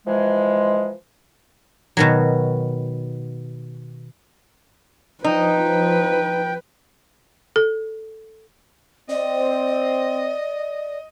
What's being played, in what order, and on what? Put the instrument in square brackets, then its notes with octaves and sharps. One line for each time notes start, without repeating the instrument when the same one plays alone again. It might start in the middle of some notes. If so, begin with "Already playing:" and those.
[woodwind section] E3 F3 G#3
[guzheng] B2 D#3 F#3
[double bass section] F3 [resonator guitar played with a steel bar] D#4 [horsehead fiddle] B4 [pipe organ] G5
[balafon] A4
[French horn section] C4 [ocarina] D5 [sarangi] D#5